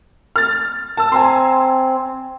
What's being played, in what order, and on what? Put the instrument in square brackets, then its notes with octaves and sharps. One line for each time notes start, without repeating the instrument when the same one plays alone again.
[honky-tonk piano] F6 A6
A5 E6
[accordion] C4 [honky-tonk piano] G#5 A#5 C6